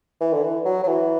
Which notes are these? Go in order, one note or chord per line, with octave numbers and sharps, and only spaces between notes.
E3
D3
E3
F#3
F#3
E3